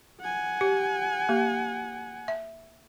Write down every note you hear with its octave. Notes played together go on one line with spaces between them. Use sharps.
F#5 G#5
G4
A#3 G4
E5